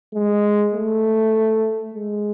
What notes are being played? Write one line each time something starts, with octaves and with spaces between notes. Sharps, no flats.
G#3
A3
G#3